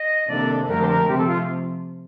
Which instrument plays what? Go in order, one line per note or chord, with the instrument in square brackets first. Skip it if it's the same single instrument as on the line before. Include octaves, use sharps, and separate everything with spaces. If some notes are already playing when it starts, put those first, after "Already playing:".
Already playing: [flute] D#5
[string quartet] C3 D#3 A#3 D4 A4 [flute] D5
[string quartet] F2 D3 A3 D4 G4 [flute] A#4
[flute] C5
A#4
[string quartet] C3 F3 A3 C4 [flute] G4
[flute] A4
F4